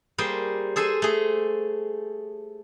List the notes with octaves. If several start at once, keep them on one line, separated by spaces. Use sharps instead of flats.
G3 A#3 G#4 C5 G5
G#4 A4 C5 G#5
A3 G#4